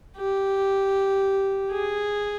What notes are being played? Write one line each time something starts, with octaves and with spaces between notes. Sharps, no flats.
G4
G#4